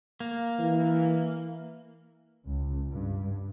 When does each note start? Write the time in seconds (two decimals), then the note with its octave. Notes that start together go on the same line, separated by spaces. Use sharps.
0.20 A#3
0.59 E3
2.46 C#2
2.91 G2